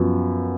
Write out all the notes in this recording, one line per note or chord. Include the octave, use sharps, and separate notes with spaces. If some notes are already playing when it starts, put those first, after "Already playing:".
Already playing: F#2 F3 B3